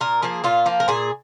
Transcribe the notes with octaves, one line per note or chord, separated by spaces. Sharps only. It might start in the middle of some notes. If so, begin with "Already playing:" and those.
A#2 A#4
F3 A#3 G#4
A#2 F4
F3 A#3
A#4
A#2 G#4